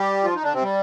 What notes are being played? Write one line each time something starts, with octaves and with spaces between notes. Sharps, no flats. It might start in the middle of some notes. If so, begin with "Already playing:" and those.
Already playing: G3 G4
F3 F4
D#4
D3 D4
C3 C4
G3